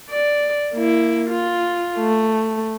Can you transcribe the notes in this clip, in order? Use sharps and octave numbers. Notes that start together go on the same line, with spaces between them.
D5
A#3 E4
F4
A3